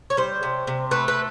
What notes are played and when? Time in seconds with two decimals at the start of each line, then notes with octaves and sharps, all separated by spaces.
0.10 C#5
0.17 G3 C5
0.43 C3
0.67 C3
0.91 A3 B4
1.08 B4